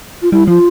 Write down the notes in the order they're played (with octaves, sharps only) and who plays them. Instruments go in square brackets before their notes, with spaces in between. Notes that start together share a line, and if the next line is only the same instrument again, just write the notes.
[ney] F4
[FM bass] G3 [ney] E4
[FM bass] F3 [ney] F4